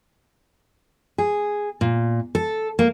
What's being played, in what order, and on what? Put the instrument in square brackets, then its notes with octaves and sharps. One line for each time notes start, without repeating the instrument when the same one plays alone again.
[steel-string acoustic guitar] G#4
A#2
A4
A#3